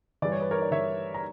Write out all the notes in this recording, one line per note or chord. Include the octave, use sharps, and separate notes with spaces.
G2 E3 D5
C#5
B4
A#4 C#5
D5
G2 E3 C#5 E5
A#5